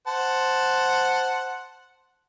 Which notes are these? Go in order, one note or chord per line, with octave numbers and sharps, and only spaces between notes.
C5 F#5 A5